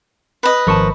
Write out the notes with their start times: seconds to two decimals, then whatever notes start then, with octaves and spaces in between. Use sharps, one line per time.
0.43 B4 D#5
0.67 G#1 F3 A#4 A5 C#6